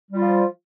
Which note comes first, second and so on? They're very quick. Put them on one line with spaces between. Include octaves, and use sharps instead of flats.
G3 F4 F3